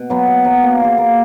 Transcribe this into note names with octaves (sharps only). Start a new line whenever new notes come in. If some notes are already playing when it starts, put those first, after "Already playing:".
Already playing: B2
F#3 B3
B2
F#3 B3
A#3
F4 G#4
A#3